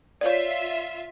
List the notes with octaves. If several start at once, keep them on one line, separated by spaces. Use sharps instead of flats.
F4 C#5 D5 E5